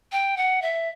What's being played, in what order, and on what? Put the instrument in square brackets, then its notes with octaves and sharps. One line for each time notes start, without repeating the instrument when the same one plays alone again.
[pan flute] G5
F#5
E5